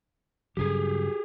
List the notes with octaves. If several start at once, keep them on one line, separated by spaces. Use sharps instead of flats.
G2 C#3 F#3 G4 G#4